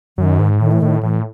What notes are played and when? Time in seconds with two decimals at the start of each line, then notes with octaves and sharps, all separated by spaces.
0.18 F#2 D#3
0.39 G#2
0.60 A2 D#3
0.72 E3
0.82 A2 D#3
1.03 A2 E3